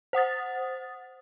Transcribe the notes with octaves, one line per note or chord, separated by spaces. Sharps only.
C5 F#5 D#6 A6